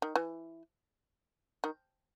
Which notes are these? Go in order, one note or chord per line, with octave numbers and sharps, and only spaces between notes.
D#3
E3
D#3